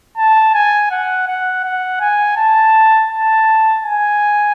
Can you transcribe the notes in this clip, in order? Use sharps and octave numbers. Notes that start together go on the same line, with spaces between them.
A5
G#5
F#5
F#5
F#5
G#5
A5
A5
G#5